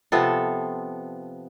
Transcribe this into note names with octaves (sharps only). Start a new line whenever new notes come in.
C3 F3 B3 A4